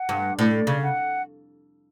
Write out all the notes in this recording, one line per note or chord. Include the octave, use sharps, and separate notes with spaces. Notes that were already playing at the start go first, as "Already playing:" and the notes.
Already playing: F#5
G2
A2 D5
C#3
F#5